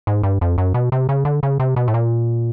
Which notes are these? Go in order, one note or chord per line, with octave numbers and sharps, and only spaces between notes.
G#2
G2
F2
F#2
B2
C3
C#3
D3
C#3
C3
B2
A2
A#2